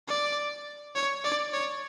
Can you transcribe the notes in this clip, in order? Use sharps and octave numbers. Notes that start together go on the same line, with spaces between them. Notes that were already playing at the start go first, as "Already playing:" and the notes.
D5
C#5
D5
C#5